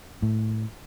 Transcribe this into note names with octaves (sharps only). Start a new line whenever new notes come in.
A2